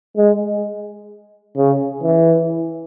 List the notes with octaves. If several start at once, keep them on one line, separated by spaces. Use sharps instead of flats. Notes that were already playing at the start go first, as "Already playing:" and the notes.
G#3
C#3
E3